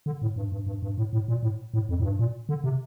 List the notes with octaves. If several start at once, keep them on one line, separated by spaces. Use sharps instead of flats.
D3
A2
G2
G2
G2
G2
A2
A2
A#2
A2
A2
F2
A2
G2
A#2
D3
C3